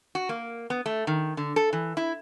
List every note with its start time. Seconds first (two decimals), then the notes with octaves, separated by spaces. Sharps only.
0.15 F#4
0.29 A#3
0.70 B3
0.86 A3
1.07 D#3
1.37 D3
1.56 A4
1.73 E3
1.97 E4